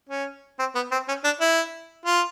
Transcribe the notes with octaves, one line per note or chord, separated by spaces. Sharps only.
C#4
C4
B3
C4
C#4
D4
E4
F4